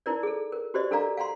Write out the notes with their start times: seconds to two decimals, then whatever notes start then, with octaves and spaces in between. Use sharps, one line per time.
0.06 D#4 E4 A#4 D5
0.23 G#4 A4
0.52 A#4
0.74 F#4 G4 C5 D5 D#5
0.91 D4 A4 A#4 D5 F5 A#5
1.17 F5 F#5 A#5 C6